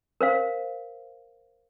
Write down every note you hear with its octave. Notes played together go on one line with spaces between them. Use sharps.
A#4 C5 F5